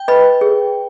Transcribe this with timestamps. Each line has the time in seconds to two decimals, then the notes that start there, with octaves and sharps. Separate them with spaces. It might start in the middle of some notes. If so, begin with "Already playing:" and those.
Already playing: G5
0.08 B4 D#5 B5
0.41 G#4